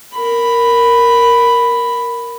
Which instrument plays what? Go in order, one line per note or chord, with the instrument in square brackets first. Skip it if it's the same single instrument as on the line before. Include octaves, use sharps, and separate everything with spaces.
[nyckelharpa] A#4 B5